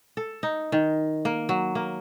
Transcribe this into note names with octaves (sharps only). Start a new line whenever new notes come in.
A4
D#4
D#3
A#3
F#3
A#3